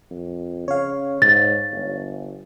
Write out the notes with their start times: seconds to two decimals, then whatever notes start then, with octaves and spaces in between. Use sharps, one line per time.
0.11 F2
0.68 C#3 C#5 F5
1.22 G#2 A6
1.71 G1